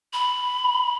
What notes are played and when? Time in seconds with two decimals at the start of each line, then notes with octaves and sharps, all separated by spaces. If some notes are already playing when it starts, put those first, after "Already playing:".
0.13 B5